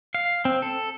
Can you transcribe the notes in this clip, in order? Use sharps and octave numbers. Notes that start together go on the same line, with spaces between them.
F5
C4
A4